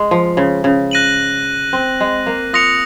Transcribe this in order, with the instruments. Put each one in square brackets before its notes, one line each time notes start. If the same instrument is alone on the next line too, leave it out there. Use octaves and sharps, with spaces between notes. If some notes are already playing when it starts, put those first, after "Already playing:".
Already playing: [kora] G#3
F3
C#3
C#3
[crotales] F#6 A#6 D#7 F#7
[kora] C4
G#3
A#3
[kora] F4 [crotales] D#6 A#6 C#7 F7